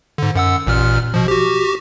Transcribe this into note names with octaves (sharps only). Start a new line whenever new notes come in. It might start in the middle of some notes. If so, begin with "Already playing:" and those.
G#2 D3
F#2 F#5 E6
A1 A#2 F6
B2 F3
F#4 G4